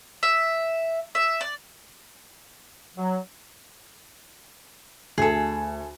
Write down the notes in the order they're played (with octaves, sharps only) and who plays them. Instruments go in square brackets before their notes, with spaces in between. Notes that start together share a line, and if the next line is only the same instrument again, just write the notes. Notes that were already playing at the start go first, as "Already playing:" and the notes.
[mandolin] E5
E5
D5
[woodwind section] F#3
[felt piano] D2 G#5 [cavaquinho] G#4 A4